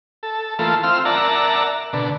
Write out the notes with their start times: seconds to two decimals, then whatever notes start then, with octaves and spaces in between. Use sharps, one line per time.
0.23 A4
0.59 E3 A3 A#3 F4 A4
0.83 C4 F4 E6 F6
1.05 A#4 D5 E5 F#5 A5 A#5
1.93 B2 D3